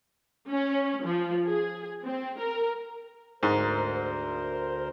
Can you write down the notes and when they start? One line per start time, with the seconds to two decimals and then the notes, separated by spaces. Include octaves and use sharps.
0.50 C#4
1.05 F3
1.45 G#4
2.04 C4
2.40 A#4
3.43 D2 G#2 A#4 C5